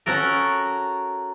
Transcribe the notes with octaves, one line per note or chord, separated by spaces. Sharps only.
C#4 F#4 A4 A#4